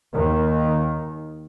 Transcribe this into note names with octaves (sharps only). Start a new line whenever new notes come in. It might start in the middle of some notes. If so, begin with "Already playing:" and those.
D#2 D#3